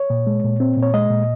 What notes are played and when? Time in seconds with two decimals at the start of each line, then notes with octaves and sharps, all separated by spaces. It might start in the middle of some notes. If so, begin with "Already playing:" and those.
Already playing: C#5
0.10 A#2
0.27 G#3
0.44 A#2
0.60 C4
0.77 A#2
0.83 C#5
0.93 G#3 D#5
1.10 A#2